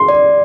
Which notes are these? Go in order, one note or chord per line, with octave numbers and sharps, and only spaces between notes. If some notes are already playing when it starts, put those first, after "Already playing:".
Already playing: C6
D5